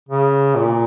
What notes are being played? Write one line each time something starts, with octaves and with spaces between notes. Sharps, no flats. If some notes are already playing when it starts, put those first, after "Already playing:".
C#3
A#2